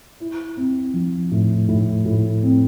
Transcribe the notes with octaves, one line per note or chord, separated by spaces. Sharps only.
E4
C4
F3
A2
A2
A2
C4